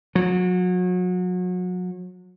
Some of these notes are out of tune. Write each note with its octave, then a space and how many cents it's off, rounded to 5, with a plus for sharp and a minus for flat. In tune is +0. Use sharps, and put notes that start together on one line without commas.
F#3 -35